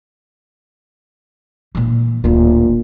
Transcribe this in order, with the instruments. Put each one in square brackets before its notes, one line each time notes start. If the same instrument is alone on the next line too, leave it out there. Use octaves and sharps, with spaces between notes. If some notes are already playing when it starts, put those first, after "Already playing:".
[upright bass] A#2 E3
[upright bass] D1 D3 [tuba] A#2